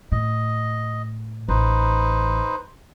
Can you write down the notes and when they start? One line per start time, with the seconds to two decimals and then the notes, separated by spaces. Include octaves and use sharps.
0.12 A2 D#5
1.49 A1 D#4 B4 C5